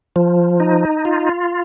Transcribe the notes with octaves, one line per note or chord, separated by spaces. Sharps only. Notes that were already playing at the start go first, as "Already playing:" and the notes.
F3
D#4
F4